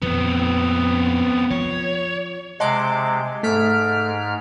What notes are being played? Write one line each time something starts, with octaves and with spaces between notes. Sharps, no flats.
F2 A#2 F3 B3 C4
F3 C#5
C3 G#3 D#5 F#5 A5 C6 D6
G#2 A3 F6 B6 D7